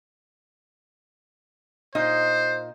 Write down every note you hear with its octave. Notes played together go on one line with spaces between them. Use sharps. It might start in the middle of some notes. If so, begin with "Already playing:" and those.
A#2 D#4 C5 D#5